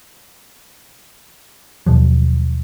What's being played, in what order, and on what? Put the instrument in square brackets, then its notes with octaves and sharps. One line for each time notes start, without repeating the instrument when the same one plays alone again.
[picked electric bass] D#2 B2 F3 F#3